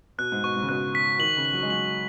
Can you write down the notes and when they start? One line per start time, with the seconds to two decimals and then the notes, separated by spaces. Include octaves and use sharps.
0.18 B2 F#6
0.32 G#2
0.44 B2 C#6
0.56 G#2
0.63 C#3
0.69 B2 F#6
0.95 B6
1.19 D#3 F#7
1.37 C#3
1.45 F#7
1.53 F#3
1.62 G#3
1.70 F#3 F#7